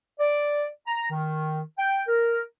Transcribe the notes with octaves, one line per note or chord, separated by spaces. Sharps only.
D5
A#5
D#3
G5
A#4